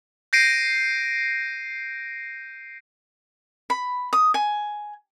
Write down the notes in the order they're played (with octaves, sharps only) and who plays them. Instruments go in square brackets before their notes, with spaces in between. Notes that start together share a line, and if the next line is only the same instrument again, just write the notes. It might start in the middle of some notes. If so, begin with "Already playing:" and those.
[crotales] G6 A#6 C7 D7 D#7
[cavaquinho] B5
D#6
G#5